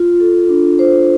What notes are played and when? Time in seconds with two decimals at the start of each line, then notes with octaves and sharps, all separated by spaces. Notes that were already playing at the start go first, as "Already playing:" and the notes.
Already playing: F4
0.20 A4
0.49 D4
0.79 C5